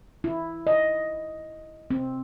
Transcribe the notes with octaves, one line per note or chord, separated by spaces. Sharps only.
E4
D#5
C4